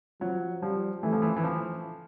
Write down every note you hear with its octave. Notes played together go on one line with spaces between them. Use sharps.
F3 F#3
F3 G3
E3 A3
F3
E3
E3
F3